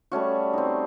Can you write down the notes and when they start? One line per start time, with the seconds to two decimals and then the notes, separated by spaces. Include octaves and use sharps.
0.12 G3 A3 C#4 F#4
0.53 C4 D#4